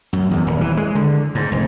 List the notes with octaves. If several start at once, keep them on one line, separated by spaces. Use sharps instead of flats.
F#2
E2
D#1
E3
G#3
D3
G#2
F1